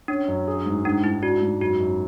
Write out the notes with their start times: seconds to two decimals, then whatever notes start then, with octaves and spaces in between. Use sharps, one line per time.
0.08 C#4 D4
0.28 F#2
0.47 G#4
0.66 G#2
0.84 G#2 D4
1.04 G#2 E4
1.22 D4 F#4
1.42 G#2
1.61 F#2 F#4
1.80 F#2